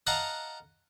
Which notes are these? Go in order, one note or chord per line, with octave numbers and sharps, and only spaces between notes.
D#5 F5 F#5 A5 A#5